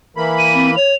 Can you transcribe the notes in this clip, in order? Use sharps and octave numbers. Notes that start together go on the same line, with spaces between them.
E3 A#3 B5
D#7
C4
C#5 F7